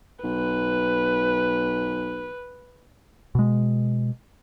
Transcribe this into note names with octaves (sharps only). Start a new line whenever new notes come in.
B1 B4
B2 G#3